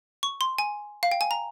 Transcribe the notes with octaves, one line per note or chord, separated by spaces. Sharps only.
C#6
C6
G#5
F5
G5
G#5
A#5